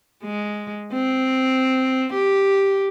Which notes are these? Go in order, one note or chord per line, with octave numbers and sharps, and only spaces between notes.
G#3
C4
G4